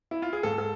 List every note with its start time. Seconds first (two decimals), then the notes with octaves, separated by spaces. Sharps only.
0.11 E4
0.22 F4
0.33 G#4
0.43 G#2 A4
0.58 A4